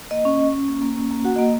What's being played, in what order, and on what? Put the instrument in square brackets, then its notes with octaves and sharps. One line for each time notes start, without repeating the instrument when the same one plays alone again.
[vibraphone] A#3 D#5
C#4
C#4
C#4
A#3
A#3
C#4
A#3
F#4 F#5
A#3 D#5